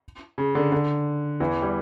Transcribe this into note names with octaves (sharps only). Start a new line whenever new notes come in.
C#3
D3
D3
E2 E3
G3